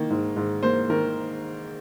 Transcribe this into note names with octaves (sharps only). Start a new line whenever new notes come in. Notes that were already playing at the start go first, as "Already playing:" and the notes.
Already playing: D#3 A#3
G#2
G#2
A#3 C5
D#3 A#4